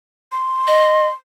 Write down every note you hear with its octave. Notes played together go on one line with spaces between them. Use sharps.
C6
D#5